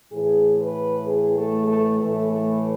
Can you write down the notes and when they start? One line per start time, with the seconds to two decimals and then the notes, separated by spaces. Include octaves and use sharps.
0.12 A2 E3 G#4
0.59 B4
1.05 G#4
1.37 A3
1.68 A3
1.99 A2 E3 A3
2.30 A3